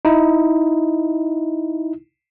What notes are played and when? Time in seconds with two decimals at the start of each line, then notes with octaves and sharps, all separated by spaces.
0.05 D#4 E4